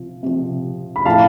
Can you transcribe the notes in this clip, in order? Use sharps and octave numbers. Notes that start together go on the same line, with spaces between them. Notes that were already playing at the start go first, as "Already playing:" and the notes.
Already playing: C3 F3
C3 F3
B5
A2 F3 F5 A5